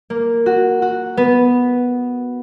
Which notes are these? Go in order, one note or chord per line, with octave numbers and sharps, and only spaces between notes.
A#3
F#4
F#4
B3